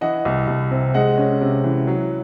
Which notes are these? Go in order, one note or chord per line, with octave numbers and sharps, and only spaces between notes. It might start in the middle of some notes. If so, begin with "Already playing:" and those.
E3 D#5 F#5
C2
C2
C3
G#3 D#5 F#5
C#4
C3
E3
F#3